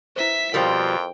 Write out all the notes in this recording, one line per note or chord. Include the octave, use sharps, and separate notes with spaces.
E4 B4 C5 E5 B6
F2 B2 F3 G3 A#4 C5 G5